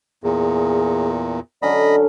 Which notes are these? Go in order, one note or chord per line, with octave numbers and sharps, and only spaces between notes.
E2 A#2 G#4
D3 F#3 C#4 D5 D#5 B5